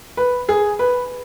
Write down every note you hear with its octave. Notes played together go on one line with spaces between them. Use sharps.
B4
G#4
B4